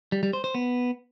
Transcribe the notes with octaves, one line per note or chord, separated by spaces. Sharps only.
G3
G3
C5
C5
B3